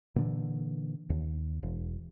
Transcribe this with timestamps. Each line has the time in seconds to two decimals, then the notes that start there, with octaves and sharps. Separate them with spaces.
0.16 A#2 D3 E3
1.10 D#2
1.63 E1